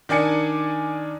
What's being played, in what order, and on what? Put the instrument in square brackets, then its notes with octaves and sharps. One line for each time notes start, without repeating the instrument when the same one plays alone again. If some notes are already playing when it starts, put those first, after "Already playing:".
[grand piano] D#3 D4 D5 G#5 C#7